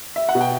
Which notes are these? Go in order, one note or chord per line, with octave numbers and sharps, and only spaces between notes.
E5
F#5
B2
G5